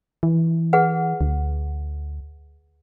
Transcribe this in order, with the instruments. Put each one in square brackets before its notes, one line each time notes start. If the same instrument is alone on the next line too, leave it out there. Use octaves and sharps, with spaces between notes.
[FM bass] E3
[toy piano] G#4 B4 F#5
[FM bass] D2